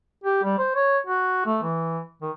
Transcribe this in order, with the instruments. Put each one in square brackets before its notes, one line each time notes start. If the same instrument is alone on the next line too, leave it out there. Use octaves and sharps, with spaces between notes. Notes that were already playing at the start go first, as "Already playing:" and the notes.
[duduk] G4
G3
C5
C#5
F#4
A3
E3
D#3